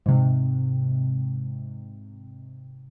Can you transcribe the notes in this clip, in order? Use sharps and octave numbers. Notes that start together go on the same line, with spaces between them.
G#2 C3